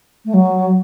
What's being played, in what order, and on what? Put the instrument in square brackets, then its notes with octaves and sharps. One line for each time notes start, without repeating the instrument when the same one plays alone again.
[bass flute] A3
F#3